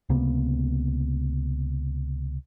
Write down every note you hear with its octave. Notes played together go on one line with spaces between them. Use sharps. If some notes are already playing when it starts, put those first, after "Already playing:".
C#2 C3 A#3 B3